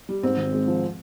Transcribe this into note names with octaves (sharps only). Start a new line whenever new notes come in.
G3
G#2 C4
G#1
G#3
F3